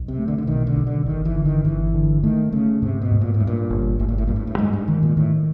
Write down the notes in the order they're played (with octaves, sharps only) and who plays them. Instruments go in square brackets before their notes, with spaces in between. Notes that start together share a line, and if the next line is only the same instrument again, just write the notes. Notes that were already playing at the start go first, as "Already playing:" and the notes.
Already playing: [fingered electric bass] B1
[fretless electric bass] C3
[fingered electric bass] A3
[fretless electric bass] D3
D3
[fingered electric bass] B2 [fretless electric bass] D#3
[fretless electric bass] D3
[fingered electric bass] B1
[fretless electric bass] D3
[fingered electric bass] G1 [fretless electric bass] D#3
[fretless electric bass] E3
[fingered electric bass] D3
[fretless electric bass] D#3
[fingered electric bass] G1 [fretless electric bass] E3
[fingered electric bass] D3
[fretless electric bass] D#3 [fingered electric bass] A3
[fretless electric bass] C#3 [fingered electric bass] A3
[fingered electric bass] G#2 [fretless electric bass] C3
[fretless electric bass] B2
[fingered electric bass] G#2
[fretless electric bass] A#2
A2
[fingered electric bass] G2
[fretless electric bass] A#2
[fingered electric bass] G1
[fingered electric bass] G1 [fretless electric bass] A2
[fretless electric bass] A#2
A2
[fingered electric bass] G2 [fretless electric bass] A#2
[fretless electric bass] A2
A2
[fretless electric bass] G#2 [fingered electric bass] G#3
[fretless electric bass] G2
[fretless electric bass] G#2 [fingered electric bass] D#3
[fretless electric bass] A#2
[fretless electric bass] A2 [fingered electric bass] D#3